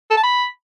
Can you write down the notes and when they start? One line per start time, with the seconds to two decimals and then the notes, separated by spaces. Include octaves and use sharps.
0.11 A4
0.17 A5
0.23 B5